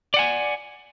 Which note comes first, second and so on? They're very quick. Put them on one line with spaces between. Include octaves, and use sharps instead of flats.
D5 F#5 G#5